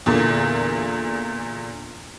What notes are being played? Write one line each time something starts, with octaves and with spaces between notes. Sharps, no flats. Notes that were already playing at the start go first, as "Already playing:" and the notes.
E2 A#2 D3